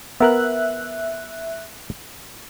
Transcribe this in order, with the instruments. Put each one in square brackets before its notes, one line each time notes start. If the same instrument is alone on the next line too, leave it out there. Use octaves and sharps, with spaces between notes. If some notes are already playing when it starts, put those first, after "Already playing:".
[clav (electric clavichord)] B3 A#4 [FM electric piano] E5 F#6